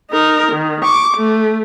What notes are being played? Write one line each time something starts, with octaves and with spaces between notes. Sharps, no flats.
D#4 A#4
D#3
C#6 D6
A3